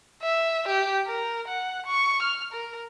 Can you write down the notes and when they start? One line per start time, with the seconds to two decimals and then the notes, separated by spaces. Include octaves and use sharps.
0.23 E5
0.68 G4
1.07 A#4
1.48 F#5
1.86 C#6
2.22 F6
2.53 A#4